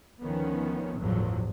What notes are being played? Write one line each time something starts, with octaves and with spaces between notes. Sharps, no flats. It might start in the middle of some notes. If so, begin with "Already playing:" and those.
D2 D#3 F3 B3 C#4
G1 E2 A2 F3 F#3